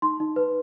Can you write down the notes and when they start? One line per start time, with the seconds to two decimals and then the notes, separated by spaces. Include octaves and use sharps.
0.02 D#4 C6
0.20 D#4
0.36 B4